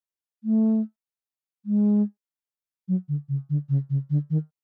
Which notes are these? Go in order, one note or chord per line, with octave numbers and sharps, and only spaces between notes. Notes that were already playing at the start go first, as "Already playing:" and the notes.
A3
G#3
F#3
D3
C#3
D3
C#3
C#3
D3
D#3